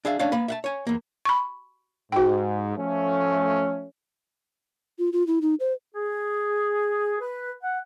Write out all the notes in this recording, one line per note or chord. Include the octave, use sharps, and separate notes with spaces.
D4 G#4 E5 F5
A3 C#4 D4 C#5 F5 G5
A#3 B4
E5 F#5 A5
C#5 G#5
E2 A#3
B5 C#6
G#2 F#4 G5
F3 A3 C#4
F4
F4
E4
D#4
C5
G#4
B4
F#5